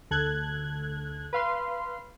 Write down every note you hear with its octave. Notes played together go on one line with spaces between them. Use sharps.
D2 A4 F#6 G#6
B4 F5 C6